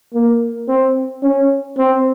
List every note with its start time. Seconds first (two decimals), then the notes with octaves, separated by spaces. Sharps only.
0.14 A#3
0.68 C4
1.23 C#4
1.78 C4